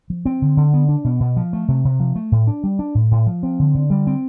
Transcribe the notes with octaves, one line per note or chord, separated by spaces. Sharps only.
F3
C4
D3
D3
B3
D4
B2
B2
F3
A3
C3
C3
F3
A3
A2
D4
G3
D4
A2
A2
F3
C4
D3
D3
G3
C4